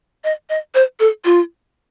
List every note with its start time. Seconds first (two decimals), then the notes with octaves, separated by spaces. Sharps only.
0.24 D#5
0.50 D#5
0.75 C5
1.00 A4
1.25 F4